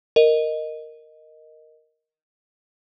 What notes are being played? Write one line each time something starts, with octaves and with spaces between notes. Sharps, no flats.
A#4 D#5